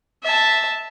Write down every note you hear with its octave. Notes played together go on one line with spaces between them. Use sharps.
E5 A5